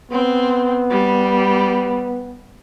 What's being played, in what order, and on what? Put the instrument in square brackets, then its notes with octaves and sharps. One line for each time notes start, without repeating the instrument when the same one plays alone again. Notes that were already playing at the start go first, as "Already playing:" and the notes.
[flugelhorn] B3 [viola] C4
[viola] G3